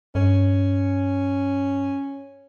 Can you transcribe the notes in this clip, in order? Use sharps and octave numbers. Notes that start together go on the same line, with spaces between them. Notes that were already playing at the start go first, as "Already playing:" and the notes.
G2 C#4